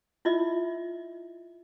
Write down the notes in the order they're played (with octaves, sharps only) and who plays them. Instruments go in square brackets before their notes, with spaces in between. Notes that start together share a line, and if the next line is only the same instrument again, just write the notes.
[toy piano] E4 F4 D#5 E5